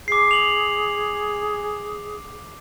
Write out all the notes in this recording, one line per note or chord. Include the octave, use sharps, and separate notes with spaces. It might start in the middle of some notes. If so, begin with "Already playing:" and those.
G#4 D6 C7
F7 F#7